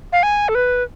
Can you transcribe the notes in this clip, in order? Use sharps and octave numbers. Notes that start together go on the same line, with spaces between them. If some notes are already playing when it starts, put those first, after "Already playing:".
F5
G#5
A4
B4